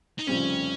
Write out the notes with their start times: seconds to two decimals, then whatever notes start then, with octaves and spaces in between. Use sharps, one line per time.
0.18 D#4
0.27 F1 F2 C#3 G3 C4 C#4